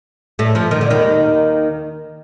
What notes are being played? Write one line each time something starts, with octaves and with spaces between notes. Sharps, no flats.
A2 A3
F2 F3
D#3
D3
D#2 D#3